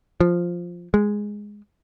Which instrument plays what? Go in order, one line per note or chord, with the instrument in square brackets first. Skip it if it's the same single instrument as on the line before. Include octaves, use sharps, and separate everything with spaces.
[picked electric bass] F3
G#3